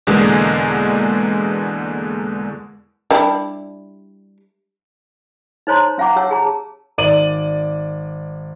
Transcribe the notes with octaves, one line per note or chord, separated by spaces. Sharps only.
E2 B2 D3 G#3 A#3
G3 D4 E4
D#4 C5 C#5 A#5 C6
C#4 F5 F#5 A#5 D6
G4 C#5 F#5 A5 E6
G#4 A5 A#5
G#1 D5 D#7 F#7